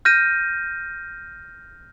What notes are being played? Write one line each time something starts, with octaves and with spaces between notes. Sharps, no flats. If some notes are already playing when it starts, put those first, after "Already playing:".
F6 G6 A#6 D#7